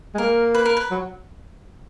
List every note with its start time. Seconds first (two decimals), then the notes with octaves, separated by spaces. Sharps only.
0.15 G#3
0.18 A#3 A#4
0.55 B4
0.65 A#4
0.77 B4
0.91 F#3